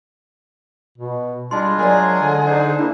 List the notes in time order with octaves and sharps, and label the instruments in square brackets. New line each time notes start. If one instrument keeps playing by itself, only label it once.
[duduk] B2
[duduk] G3 [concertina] G#3 D4 F4 [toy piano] A5 C6
[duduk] F#3 [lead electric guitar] G#4 [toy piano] A#4 D5
[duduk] D3
[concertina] D4 D#4 C5 [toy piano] D5
[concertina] A#3 [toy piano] D4 [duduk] E4